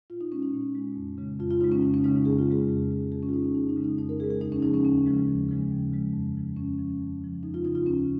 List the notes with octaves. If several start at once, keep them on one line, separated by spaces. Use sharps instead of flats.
A#2 F4
D#4
G#3 C#4
D#4
A#2
G#3
F2
C#3 G#3
F2 F4
F4
C#3 G#3 D#4
C#4
F2 D#4
C#4
C#3 G#3 D#4
F2 G#4
F4
C#3 G#3 G#4
F2
C#3 G#3
F2 G#4
C#4
F4
C#3 G#3 D#4
C#4
F2 D#4
D#4
C#3 G#3
D#4
F2 D#4
A#4
C#3 G#3 G#4
G#4
D#2 D#4
C#4
C#3 F3 G#3 D#4
C#4
D#2 C#4
C#3 F3 G#3
D#2
C#3 F3 G#3
D#2
C#3 F3 G#3
F2
C#3 F3
F2 C#4
C#3 F3
F2
C#3 F3
F2 D#4
F4
C#3 F3 D#4
F4
D#2 C#4